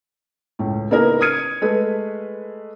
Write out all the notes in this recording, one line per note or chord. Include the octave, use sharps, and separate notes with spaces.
C#2 A2
C#3 A#3 B3 D#4 E4 A#4
D#6 F6 G#6 C#7 D#7
G#3 A3 B4